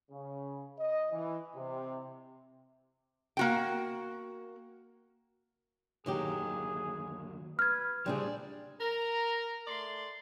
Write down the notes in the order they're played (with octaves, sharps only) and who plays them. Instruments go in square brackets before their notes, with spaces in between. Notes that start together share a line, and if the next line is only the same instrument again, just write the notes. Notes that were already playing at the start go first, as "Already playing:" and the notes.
[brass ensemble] C#3
D#5
E3
C3
[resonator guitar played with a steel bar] A#3 F#4 G5
[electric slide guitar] D3 D#3 A#3 [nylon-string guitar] F#3 D#4 G4 [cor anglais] G#4
[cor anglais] B4 [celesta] F6 G#6
[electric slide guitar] C#3 F3 G4 [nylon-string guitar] G3 D4 G#4 [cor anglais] C4
[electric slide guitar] D5
[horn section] A#4 A#5
A3 D5 C6